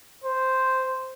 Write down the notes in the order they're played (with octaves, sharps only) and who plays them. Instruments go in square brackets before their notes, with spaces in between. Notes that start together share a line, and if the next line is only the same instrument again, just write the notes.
[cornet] C5